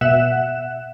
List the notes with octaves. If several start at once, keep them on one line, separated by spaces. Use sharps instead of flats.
B2 E5 F#5 F#6 E7